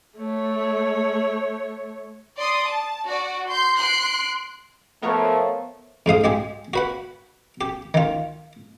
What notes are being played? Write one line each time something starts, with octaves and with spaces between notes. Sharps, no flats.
A3 C#5
D5 C6 D#6
A5
F#4 D5 F#5
C6 G6
C6 F#6 C7 D7
F3 A3 B3 A#4 C#5
F2 G#2 F5 D#6
G#3 G4 G#4
F#4 B4 F#5
G4
D#3 F4